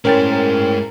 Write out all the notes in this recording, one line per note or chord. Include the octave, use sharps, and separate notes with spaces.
A2 G#3 C#4 A#4 C5 G5 A6